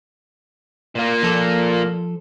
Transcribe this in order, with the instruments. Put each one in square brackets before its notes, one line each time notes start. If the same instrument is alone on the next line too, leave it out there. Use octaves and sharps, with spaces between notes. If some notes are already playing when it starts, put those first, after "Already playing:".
[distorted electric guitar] A#2 A#3
[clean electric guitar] F3 A4